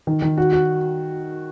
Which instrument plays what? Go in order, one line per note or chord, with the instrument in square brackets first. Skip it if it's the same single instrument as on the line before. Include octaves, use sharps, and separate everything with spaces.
[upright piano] D#3
D#3
F#4
F#4